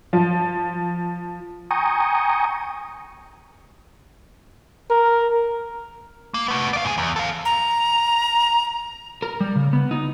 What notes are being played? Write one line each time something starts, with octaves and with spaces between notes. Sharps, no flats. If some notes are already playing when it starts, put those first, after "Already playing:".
F3
G5 G#5 A#5 C#6 D#6
A#4
A#3
A3 B3
D5 F5
G#2 G#4
E2
A4 F5
A#5
A#4
G3
C#3
B3
D#4